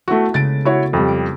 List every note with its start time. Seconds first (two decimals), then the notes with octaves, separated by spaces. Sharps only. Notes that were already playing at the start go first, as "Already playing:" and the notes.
0.08 A3 B3 E4 F#4
0.34 C#3 G#3 A3 A6 D7
0.65 E4 F#4 C#5
0.93 F2 G3
1.08 D7